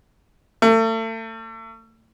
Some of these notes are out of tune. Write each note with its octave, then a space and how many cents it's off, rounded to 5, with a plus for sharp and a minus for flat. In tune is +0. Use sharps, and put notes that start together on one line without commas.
A3 +35